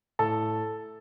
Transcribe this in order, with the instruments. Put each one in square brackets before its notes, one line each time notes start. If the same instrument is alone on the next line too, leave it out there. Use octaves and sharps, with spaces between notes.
[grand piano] A2 A4 A5